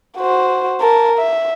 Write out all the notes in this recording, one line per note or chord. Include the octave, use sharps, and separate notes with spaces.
F#4 C5
A#4 A5
E5